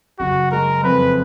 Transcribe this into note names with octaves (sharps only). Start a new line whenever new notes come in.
F#1 F#4
G#3 A#4
F2 B4